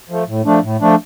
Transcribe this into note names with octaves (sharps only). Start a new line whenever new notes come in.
F3 A3
A2
F3 A3 D4
A2
F3 A3 D4